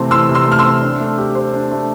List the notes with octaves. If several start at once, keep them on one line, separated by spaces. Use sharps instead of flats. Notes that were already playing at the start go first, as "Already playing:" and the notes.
Already playing: C3 E3 A3 C4
E3 C6 E6
C3
C6 E6
A3 F6
C6 E6
C4
D4
A3
G4
C5
D4
A3